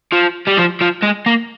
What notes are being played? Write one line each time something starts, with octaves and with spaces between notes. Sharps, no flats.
F3
G3
F3
F3
G#3
A#3